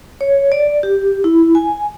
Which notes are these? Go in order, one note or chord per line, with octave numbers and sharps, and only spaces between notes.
C#5
D5
G4
E4
G#5